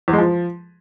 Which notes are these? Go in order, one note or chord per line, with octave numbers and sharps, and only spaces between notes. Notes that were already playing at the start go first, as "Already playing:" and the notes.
E2
G#3
F3